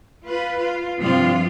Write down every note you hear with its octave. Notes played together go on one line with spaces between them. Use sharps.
F4 B4
F4
G2 C3 F3 F4